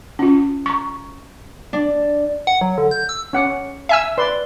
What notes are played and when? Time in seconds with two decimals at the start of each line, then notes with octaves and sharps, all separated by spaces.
0.19 C#4 F4
0.66 A#5 C#6
1.73 D4
2.47 F#5
2.61 F#3
2.78 D3
2.91 G6
3.09 E6
3.33 C#4 F#5 D6
3.89 E5 G#5 E6
4.18 B4 D5 C6